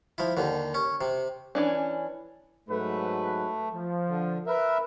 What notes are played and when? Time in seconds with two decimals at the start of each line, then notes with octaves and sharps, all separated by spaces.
0.18 F3 E4
0.37 D#2 D3
0.74 C#4
1.01 C3
1.55 E3 C#4 D4
2.69 G#2 F#3 A3 B4
3.73 F3
4.07 D3
4.47 A#4 B4 E5